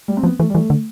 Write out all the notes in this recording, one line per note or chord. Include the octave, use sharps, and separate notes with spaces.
G3
C4
F3 B3
E3 A3
G3
E3 A3
D3